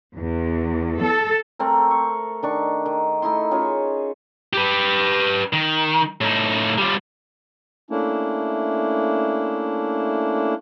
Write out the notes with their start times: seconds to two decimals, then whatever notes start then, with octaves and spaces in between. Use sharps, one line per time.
0.16 E2
1.01 A4
1.59 A3 C4 A#4
1.91 C#6
2.43 D#3 D4 C#6
2.85 D#3
3.22 A3 D#4 E4 C6
3.51 C#4 F4 G#4 C#5
4.53 G4 B4
5.53 D#3
6.21 A2 D#4
6.78 G3 F4
7.90 A3 A#3 C#4 D4 E4